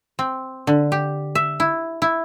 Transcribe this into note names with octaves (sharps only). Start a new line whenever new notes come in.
C4
D3
G4
E5
E4
E4